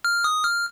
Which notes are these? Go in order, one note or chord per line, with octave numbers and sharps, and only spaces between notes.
F6
D#6
F6